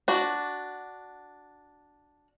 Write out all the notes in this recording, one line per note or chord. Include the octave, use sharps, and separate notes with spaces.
D4 F#4